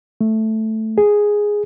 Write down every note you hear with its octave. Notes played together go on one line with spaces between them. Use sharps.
A3
G#4